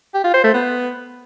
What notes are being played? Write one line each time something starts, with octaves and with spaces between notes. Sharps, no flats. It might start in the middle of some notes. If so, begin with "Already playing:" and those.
G4
F4
C5
A3
B3